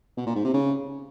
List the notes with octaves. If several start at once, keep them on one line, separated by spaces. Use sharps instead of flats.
B2
A#2
G#2
C3
C#3